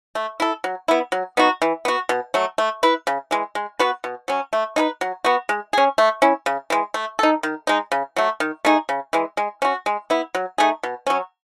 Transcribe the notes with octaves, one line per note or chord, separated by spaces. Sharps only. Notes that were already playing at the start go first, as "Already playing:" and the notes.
A3
E4 A4
F#3
B3 E4
F#3
B3 D#4 F#4
E3
B3 F#4
B2
F#3 A3
A3
E4 B4
C#3
E3 G#3
G#3
B3 F#4 B4
B2
F#3 C#4
A3
D#4 G#4 B4
F#3
B3 F#4
G#3
C#4 G#4
A3
C#4 E4
C#3
E3 G#3
A3
D#4 A4
D#3
G#3 D#4
C#3
F#3 A3
D#3
A3 D#4 G#4
C#3
E3 G#3
G#3
C#4 F#4
G#3
B3 E4
F#3
A3 D#4 G#4
B2
F#3 C#4